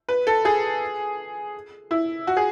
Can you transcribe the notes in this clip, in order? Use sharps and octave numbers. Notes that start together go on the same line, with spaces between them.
B4
A4
G#4
E4
F#4
G#4